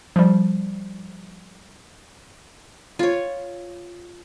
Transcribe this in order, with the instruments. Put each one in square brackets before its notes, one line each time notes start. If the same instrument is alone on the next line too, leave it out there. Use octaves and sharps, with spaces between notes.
[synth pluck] F3 G3
[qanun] F4 C#5